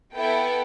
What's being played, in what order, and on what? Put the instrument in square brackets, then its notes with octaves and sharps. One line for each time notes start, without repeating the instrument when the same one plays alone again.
[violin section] B3 E4 A4 G5